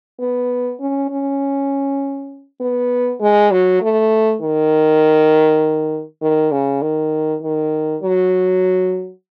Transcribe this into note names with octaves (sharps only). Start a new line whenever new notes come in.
B3
C#4
C#4
B3
G#3
F#3
A3
D#3
D#3
C#3
D#3
D#3
F#3